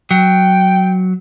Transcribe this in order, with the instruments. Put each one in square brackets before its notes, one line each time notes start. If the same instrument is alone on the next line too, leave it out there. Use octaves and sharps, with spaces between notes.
[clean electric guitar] F#3 [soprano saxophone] G5